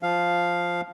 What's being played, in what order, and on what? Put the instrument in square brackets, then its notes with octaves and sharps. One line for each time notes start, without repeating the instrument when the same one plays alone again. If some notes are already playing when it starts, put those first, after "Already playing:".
[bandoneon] F3 F5